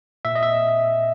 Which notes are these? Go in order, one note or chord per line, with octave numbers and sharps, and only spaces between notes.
A#2 E5
D#5
E5